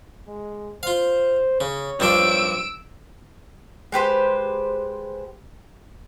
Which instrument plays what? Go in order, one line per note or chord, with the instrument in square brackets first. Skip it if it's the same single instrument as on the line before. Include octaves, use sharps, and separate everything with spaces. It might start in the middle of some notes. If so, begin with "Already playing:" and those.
[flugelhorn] G#3
[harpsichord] F4 F5 [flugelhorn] C5
[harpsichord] C#3 [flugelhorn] C#5
[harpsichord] G2 F3 D4 [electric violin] E6 D7
[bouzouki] G#3 G4 B4 C5